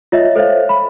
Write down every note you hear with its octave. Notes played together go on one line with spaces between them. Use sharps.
F4 C#5 D#5 E5
A4 C5 C#5 E5 F5
B5